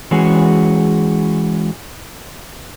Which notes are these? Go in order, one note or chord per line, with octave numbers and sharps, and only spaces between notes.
E3 G#3 C#4 F#4 G#4